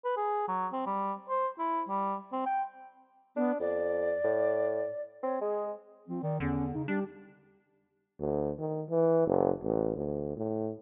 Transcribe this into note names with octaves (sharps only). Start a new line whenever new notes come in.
B4
G#4
F#3
C4
G3
C5
E4
G3
C4
G5
B3 D4
F2 D5
A2
C4 C#5
G#3 G#4
F3 C4
D#3 D5
E2 D3 C#4
C#3 D#4
G3 D4 G4
D2
D#3
E3
F#1
A1
D2
A2